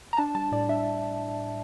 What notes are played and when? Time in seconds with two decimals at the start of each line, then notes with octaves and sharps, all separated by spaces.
0.13 A#5
0.17 D4 A5
0.35 G3 A5
0.52 A2 D5
0.69 D4 E5